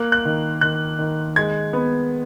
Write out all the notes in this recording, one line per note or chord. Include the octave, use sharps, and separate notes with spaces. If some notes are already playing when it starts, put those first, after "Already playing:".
Already playing: A#3 F#6
F#6
D#3
D#3 F#6
D#3
G#3 G#6
B3